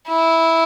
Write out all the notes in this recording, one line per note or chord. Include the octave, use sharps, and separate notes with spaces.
E4